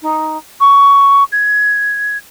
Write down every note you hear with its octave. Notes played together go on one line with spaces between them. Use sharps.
D#4
C#6
G#6